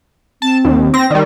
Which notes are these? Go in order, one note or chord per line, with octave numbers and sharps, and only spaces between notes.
C4 A5
D#2
C4 A#6
D#3 G3 D5